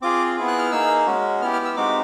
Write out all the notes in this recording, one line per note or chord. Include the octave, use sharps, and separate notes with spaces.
C4 F4 G#4 D6
B3 E4 G#4
F#6
F6
A#3 D#4 G#4 E6
G#3 C#4 F#4
B3 E4 G4 F6
F6
E6
G#3 C4 D#4 F#4 D6